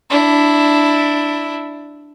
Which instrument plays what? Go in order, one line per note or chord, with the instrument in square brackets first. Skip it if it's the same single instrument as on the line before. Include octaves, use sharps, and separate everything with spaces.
[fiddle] D4 E4